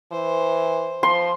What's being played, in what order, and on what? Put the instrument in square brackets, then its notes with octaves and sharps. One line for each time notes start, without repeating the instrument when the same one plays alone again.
[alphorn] E3 [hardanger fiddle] C5
[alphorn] F3 [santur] C6